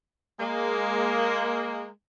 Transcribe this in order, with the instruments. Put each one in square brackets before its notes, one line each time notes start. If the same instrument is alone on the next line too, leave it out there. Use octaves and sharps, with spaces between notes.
[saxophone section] G#3 A#3